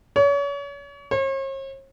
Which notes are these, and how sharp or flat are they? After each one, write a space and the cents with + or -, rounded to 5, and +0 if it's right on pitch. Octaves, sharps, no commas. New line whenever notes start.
C#5 +35
C#5 -45